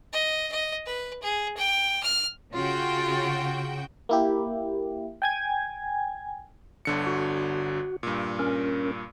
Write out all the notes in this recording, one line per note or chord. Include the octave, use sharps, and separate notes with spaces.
D#5
D#5
B4
G#4
G5
F6
C#3 F4 F#4 G5
A#3 E4 G4
G5 G#5 G#6
G1 D3 C#7
F#4
G2 A#2
C#4 A#4